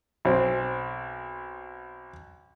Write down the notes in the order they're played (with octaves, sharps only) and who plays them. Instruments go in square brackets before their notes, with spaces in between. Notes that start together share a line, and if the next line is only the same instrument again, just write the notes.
[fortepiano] B1 C4